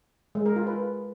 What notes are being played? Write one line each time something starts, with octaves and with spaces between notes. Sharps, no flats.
G#3
A#4
F4
B4